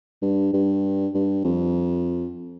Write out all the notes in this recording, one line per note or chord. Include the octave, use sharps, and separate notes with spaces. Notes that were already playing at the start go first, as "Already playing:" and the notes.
G2
G2
G2
F2